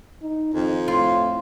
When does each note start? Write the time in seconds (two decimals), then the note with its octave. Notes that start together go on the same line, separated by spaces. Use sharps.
0.22 D#4
0.54 F2 D#3
0.88 A2 F4